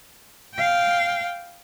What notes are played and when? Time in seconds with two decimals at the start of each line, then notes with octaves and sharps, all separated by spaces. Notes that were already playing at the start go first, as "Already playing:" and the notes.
0.55 F5 G5